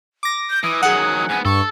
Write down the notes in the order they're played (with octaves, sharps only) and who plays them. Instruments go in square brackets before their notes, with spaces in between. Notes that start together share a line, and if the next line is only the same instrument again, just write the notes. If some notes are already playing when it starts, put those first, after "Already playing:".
[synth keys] D6 A#6
[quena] G6
[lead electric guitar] E3 [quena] D#6
[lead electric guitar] D#3 F#3 [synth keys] G#4 F#5
[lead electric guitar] G#2 B3 [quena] G#5
[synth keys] G2 [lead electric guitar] A4 [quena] C#6